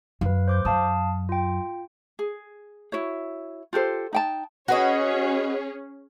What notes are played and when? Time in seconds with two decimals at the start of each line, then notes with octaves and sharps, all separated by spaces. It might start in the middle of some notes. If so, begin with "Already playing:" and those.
0.21 F#2 B4 F5
0.48 C5 D6 G6
0.65 F#2 F5 A5 D#6
1.29 F4 G5
2.19 G#4
2.92 E4 F#4 C#5
3.73 F4 G4 A4 C5
4.13 D#4 G5 A5
4.68 C#4 F#4 G#4 B4 C#5 D#5